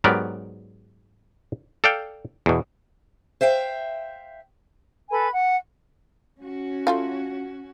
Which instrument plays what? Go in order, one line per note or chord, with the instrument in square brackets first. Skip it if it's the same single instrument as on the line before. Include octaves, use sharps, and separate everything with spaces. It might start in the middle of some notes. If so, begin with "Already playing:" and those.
[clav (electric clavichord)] G#2 F#3 B3 G4 A#4 D5
A4 D5 F5 G5
E2 B2
[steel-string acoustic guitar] C5 E5 F5 G5
[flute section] A4 B4 G#5 B5
F#5
[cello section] C#4 F#4
[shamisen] A3 F4 F5